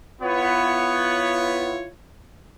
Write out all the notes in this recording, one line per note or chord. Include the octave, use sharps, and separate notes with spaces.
B3 E4 F4 C#5